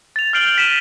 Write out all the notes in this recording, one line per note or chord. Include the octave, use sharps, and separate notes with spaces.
A6 F7
F6 G6 C7 D7 F#7 G7
B6 D#7 E7